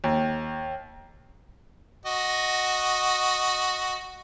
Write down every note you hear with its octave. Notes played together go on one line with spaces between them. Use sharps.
D#2
F#4 D#5